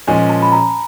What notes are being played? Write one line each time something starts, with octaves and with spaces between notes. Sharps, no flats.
A#2 F3 G#3 C#4 G#5
A5
B5
A#5